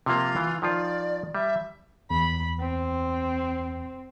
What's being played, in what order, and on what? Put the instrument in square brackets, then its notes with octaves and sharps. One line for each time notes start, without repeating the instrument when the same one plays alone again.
[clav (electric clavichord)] C3 F3 A#3 [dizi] F4
[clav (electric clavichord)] E3
[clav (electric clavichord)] D#3 F3 F4 [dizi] D5
[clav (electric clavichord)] G3 [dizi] E5
[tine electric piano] E2 [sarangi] B5
[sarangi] C4